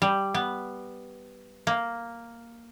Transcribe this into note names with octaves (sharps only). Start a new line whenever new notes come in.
G3
B3
A#3